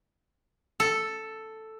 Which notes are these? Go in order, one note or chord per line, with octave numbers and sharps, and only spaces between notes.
A4